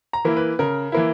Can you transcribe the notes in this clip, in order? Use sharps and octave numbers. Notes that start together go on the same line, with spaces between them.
A#5
E3 A#3 E4
B4
C#3 A#4
E3 A#3 E4